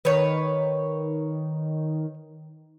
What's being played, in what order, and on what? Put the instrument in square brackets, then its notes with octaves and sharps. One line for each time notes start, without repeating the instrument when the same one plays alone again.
[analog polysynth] D#3 [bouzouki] B4 C#5